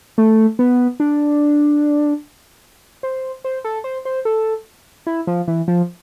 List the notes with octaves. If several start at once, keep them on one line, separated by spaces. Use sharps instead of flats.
A3
B3
D4
C5
C5
A4
C5
C5
A4
E4
F3
E3
F3